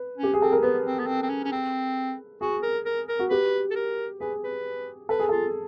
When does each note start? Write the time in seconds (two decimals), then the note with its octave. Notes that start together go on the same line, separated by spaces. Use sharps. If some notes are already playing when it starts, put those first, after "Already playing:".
Already playing: B4
0.18 C#4
0.23 G4
0.34 G#4
0.40 C4 A4
0.52 A#4
0.62 B3 B4
0.85 C4
0.99 B3
1.07 C4
1.23 C4
1.30 C#4
1.44 C#4
1.52 C4
2.41 F#4 G#4
2.63 A#4
2.86 A#4
3.09 A#4
3.19 F#4
3.30 G4 B4
3.71 A4
3.76 A#4
4.20 G#4 B4
4.44 B4
5.09 A4 B4
5.19 G#4
5.29 F4 A4